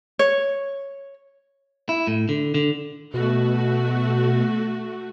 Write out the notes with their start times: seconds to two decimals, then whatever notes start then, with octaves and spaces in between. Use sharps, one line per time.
0.19 C#5
1.89 E4
2.07 A2
2.29 D3
2.54 D3
3.14 B2 A3 F#4